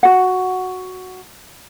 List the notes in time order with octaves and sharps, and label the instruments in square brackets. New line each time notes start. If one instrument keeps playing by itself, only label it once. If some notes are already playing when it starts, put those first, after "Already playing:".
[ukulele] F#4 F#5